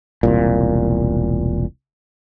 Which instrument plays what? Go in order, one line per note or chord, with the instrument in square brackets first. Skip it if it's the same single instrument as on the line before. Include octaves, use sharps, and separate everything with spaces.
[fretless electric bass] E1 C2 A#2